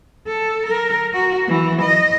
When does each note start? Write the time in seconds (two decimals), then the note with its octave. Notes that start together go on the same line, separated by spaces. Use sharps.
0.27 A4
0.67 A#4
1.14 F#4
1.48 E3
1.82 D#5